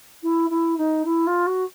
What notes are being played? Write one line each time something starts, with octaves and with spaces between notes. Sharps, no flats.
E4
E4
D#4
E4
F4
F#4